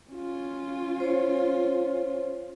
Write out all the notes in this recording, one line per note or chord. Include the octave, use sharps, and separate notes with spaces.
C#4 F4
C5 C#5